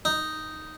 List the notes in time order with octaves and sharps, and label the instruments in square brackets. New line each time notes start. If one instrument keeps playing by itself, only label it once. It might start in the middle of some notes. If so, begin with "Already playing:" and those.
[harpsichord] D#4